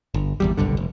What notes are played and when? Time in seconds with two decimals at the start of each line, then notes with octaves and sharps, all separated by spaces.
0.14 G1
0.40 G#1 E2 G3
0.57 F#1 B1 G2 D3
0.77 F1